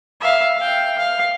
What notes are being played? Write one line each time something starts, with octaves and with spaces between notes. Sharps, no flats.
E5 F5
F5 G5
F5